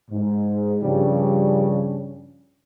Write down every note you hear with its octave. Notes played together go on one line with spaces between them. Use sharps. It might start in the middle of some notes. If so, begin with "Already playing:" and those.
G#2
G2 C#3 F3 G3 C#4 D4